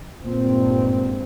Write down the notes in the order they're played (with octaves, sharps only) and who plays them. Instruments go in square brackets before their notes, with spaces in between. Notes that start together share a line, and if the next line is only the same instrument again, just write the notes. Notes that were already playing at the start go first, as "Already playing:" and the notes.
[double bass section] G#1 G2 C4 [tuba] A#2